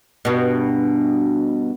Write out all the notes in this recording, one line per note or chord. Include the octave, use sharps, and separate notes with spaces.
G2 B2